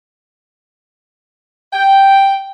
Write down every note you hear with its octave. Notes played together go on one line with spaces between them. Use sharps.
G5